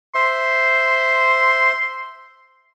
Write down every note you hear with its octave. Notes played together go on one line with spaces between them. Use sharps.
C5 E5 C6